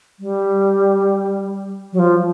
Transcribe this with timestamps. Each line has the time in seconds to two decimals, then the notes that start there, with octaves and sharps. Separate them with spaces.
0.20 G3
1.93 F#3
1.99 F3